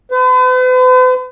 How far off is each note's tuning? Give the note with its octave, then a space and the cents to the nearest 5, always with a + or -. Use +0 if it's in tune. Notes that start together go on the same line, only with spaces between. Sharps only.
B4 +45